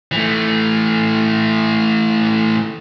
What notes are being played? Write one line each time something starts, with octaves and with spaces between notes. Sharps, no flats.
E3 A3